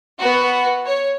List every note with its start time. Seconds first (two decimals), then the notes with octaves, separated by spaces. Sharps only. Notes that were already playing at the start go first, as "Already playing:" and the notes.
0.19 B3 F#4
0.86 C#5